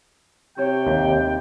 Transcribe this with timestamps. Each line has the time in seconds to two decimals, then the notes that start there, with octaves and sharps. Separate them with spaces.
0.57 C3 F#4 C#5 G5
0.87 D#2